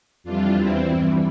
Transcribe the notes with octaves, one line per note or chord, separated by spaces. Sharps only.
F2 E3 G3 D4 F4
E2 E3 G3 C4 E4
G2 E3 G3